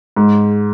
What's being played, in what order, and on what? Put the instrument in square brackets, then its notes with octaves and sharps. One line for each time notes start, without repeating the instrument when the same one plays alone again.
[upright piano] G#2